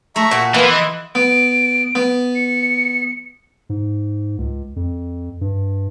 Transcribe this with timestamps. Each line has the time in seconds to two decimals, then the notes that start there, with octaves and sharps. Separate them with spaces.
0.16 A3 E5 A#5 C#6
0.31 A#2 F#4
0.54 E3 A#3 B3 E4 A#5 C6
0.71 D#5 F#6
1.15 B3 D7
1.95 B3
2.36 C#7
3.69 G#2
4.38 C#2
4.76 F2
5.41 G2